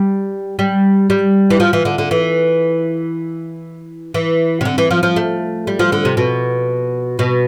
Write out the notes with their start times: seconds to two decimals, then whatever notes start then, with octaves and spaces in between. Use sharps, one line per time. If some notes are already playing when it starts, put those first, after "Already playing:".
Already playing: G3
0.59 G3
1.10 G3
1.50 E3
1.60 F3
1.73 E3
1.85 D3
1.98 D3
2.11 E3
4.14 E3
4.61 C3
4.65 D3
4.78 E3
4.91 F3
5.03 F3
5.16 A3
5.67 G3
5.79 F3
5.92 D3
6.05 C3
6.17 B2
7.19 B2